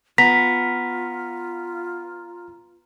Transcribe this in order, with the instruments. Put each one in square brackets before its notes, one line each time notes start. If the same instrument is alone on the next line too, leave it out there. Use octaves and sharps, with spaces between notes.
[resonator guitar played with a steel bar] B3 [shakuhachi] F4 [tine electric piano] A#5 [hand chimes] B6